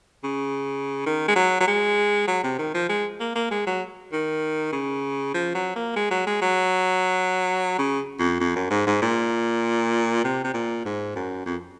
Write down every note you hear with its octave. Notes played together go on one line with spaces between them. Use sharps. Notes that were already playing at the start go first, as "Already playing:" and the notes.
C#3
D#3
G#3
F#3
F#3
G#3
F#3
C3
D#3
F3
G#3
A#3
A#3
G#3
F#3
D#3
C#3
F3
F#3
A#3
G#3
F#3
G#3
F#3
C#3
F2
F2
F#2
G#2
G#2
A#2
C3
C3
A#2
G#2
F#2
F2